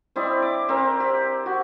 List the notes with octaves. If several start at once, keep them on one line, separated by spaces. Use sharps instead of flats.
C4 E4 D5 D#5
D6
C4 A#4
G4
F#4